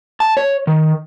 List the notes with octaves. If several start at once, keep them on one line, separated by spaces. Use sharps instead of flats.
A5
C#5
D#3